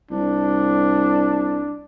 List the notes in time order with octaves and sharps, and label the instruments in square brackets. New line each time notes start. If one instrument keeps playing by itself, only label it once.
[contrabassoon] C2 [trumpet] D4